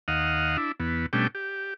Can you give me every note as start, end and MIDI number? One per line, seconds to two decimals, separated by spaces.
0.08 0.57 39
0.08 0.57 75
0.08 0.57 77
0.08 0.57 78
0.57 0.72 62
0.57 0.72 64
0.80 1.06 40
0.80 1.06 59
1.13 1.27 47
1.13 1.27 55
1.13 1.27 57
1.13 1.27 61
1.13 1.27 62
1.13 1.27 79
1.35 1.74 67